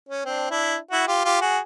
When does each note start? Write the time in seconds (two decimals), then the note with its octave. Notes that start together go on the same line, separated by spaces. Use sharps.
0.09 C#4
0.25 C4 D4
0.50 D4 E4
0.91 E4 F#4
1.08 F4 G4
1.25 F4 G4
1.41 F#4 G#4